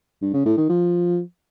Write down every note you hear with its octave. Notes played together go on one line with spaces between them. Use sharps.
G2
C#3
A2
D#3
F3